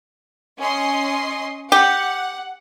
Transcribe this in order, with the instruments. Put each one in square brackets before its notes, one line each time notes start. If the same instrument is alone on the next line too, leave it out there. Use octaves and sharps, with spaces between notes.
[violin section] C#4 D#5 C6
[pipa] G4 [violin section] F#5